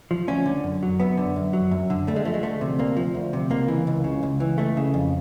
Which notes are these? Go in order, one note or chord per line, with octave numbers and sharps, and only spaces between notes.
F3
D2 C#4
D3
F#2
F#3
F#2 B3
D3
F#2
F#3
F#2
D3
D2 A3
G#3
F3 A3
G#3
D2 A3
C3
D2 A#3
F3
D2
C3
C#2 A#3
E3
C#2
C#3
C#2
E3
C#2 A3
C#3
F2